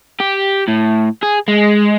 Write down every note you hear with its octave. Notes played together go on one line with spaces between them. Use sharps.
G4
A2
G#4
G#3